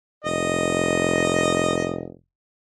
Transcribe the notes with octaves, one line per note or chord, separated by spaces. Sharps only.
F1 D#5